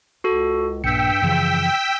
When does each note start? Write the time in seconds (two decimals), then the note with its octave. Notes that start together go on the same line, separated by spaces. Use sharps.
0.24 C#2 F#4 A4
0.84 A#1 G2 G5 E6 B6 C#7
1.22 F#2 C#3 E3 F3